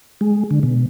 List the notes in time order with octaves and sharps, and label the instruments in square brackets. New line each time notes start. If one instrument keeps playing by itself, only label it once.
[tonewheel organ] G#3
D3
B2